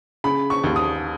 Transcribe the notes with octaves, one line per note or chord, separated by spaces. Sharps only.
C#3 B5
C#6
D#2
D#6